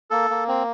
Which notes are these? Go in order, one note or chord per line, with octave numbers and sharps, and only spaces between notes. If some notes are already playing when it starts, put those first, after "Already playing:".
A#3 A4
A#3
C4